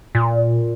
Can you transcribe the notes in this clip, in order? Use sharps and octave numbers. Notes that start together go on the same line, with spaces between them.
A#2